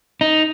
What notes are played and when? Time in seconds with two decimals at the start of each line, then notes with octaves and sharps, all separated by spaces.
0.21 D#4